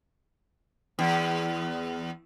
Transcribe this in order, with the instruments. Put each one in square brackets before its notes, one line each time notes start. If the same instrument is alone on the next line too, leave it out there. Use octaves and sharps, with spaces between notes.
[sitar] E2